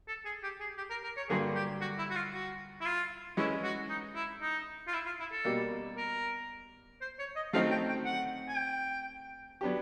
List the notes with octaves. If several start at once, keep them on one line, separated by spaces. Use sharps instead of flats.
A4
G#4
G4
G#4
G4
A#4
A#4
C#5
G2 D3 F#3 A#3 G#4
G4
F#4
E4
F#4
F4
F#4
E4
F4
E3 G#3 C#4 E4
F#4
D#4
E4
D#4
F4
E4
F4
E4
A4
B2 G3 A#3
A#4
C5
C#5
D#5
F#3 A3 C4 D#4 F5
G5
G5
F#5
G#5
G5
F#3 B3 D4 G4